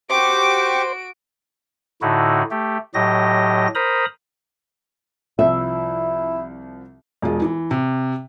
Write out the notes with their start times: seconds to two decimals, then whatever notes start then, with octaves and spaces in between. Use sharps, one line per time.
0.10 F#4 G4 C5 C#6 D6 D7
2.02 A2 D3 D#4 E4 F#4
2.51 A3 G4
2.94 A2 F#3 G4 D#5 A#6
3.75 A#4 C5 A#5 B5 D#6
5.39 C2 F3 E4 E5
7.22 E1 G#3 F4
7.42 E3
7.71 C3